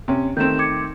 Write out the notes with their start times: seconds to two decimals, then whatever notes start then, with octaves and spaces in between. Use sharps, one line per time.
0.08 C3 C#4
0.37 D#3 A3 C4 G6 E7
0.59 D6 G#6 C#7